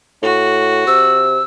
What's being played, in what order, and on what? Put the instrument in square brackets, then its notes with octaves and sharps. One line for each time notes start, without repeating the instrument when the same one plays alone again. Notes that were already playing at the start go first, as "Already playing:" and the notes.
[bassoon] A2 [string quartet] F#4
[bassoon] C3 [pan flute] E6